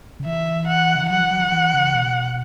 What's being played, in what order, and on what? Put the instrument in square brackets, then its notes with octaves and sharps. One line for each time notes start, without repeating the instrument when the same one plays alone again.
[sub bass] C#3
[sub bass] E3 [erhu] E5
[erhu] F#5
[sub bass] C#3
E3
[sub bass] F#3 [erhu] F#5
[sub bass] E3
F#3
E3
E3
C#3
B2